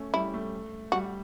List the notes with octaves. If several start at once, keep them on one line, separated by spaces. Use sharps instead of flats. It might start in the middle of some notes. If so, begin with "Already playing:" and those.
Already playing: A3 C#4
G3 E4
A3
G3 F#4